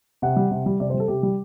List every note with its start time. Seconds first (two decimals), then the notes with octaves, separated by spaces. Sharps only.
0.22 C3 F#5
0.36 G3
0.51 C3
0.66 G3
0.80 C3 D5
0.90 C5
0.94 G3
1.00 A4
1.08 C3 G4
1.23 G3